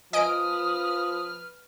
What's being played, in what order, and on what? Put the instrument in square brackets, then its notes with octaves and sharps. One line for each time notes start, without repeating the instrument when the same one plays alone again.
[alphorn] F3 [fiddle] B4 F6 [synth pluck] D#5 G#5 D7 [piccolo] D#6